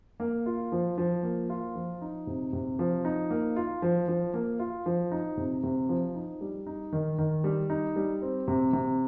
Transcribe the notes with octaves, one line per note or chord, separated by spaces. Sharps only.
A#3
F4
F3
F3
A#3
F4
F3
D#4
C3
C3
F3
D#4
A#3
F4
F3
F3
A#3
F4
F3
D#4
C3
C3
F3
D#4
G3
D#4
D#3
D#3
G3
D#4
G3
C4
C3
C3